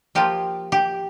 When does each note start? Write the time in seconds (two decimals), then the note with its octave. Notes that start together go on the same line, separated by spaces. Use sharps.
0.15 F3 A#3 F4 G4
0.72 G4